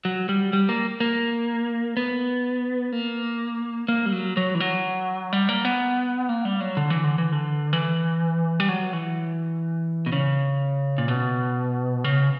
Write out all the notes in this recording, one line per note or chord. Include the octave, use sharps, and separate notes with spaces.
F#3
G3
G3
A#3
A#3
B3
A#3
A#3
G3
F#3
F#3
E3
F#3
G3
A#3
B3
A#3
G3
F#3
D3
E3
D3
E3
D3
E3
G3
F#3
E3
B2
C#3
A#2
B2
C#3